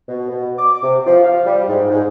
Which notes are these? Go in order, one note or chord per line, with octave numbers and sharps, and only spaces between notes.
B2
B2
D6
C3
F3
F5
G3
G#2
G#2